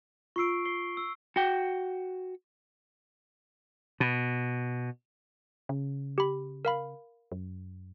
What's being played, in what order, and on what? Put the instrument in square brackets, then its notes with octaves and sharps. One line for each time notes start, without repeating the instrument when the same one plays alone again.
[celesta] F4 E6 [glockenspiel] C#6 C7 D7
[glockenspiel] C7 G7
E6
[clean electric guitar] F#4 G5
[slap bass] B2
[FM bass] C#3
[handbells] G4 B5
A#4 F5 B5
[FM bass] F#2